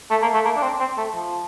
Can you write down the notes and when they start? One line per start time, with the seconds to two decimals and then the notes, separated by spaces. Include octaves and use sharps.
0.11 A3
0.22 A#3
0.34 A3
0.45 A#3
0.56 D4
0.63 C4
0.80 C4
0.97 A3
1.15 F3